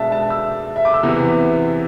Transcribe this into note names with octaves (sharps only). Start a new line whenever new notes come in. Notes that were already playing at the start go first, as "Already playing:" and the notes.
Already playing: B2 G#3 D4 E5 A5
A5
E6
E5
D6
E6
E2 C3 E3 B3